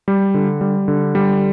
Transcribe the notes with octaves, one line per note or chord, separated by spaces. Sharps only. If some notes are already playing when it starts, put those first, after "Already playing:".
G3
D3
G3
D3
G3